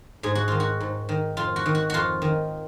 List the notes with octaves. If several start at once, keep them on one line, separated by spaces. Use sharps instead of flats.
G#2 G#4
F#4
D#3 F4
F#4
G#2
D#3
F2 F4
F#4
D#3
F#4
F2 F4 F#4
D#3